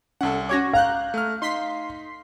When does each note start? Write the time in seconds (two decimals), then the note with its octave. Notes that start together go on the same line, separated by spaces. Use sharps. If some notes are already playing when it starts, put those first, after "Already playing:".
0.21 C2 C#4 A4 F#5
0.49 C#4 F#4 C#5 D6 G#6 A#6
0.73 F5 A#5 F#6 G6
1.14 A3 F6
1.42 D#4 C6 B6 C7